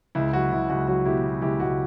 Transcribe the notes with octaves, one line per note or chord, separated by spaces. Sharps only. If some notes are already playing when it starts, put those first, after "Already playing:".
C#2 E4
F#3 F#4
C#2 E4
C#2 F#4
F#3 F#4
B2 E4 G4
B2
C#2 E4 G4
C#2 F#4